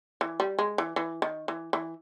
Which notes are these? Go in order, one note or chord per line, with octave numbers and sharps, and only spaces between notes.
E3
G3
G#3
E3
E3
D#3
E3
E3